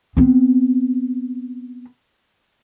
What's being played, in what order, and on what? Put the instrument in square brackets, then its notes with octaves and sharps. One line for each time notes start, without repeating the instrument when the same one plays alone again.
[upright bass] B3 C4